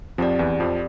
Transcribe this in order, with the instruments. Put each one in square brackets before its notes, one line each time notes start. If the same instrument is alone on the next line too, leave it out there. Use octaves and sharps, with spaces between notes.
[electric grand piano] F2 F3 [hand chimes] C4 G4 D5
[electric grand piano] E2 E3
F2 F3